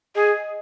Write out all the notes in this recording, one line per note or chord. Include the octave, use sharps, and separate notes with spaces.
G#4 D#5